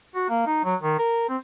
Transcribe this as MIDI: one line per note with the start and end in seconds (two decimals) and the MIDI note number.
0.15 0.25 66
0.29 0.44 58
0.46 0.62 63
0.65 0.75 54
0.82 0.97 51
0.99 1.25 70
1.29 1.37 60